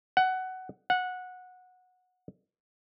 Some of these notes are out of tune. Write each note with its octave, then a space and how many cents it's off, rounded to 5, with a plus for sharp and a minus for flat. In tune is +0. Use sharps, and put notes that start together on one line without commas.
F#5 +15
F#5 -15